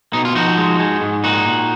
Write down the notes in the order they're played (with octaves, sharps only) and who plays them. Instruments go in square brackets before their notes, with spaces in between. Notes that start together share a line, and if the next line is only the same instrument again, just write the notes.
[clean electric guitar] B2 D#4
F4
F3 D#4 F#4
G#3
G#3
G#2
A#2 D#4 F#4
A#2